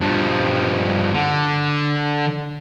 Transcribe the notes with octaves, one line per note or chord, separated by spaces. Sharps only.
G2 F3
D3